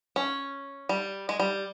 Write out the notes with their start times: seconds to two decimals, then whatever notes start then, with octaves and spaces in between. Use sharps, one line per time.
0.16 C#4
0.89 G3
1.29 G#3
1.39 G3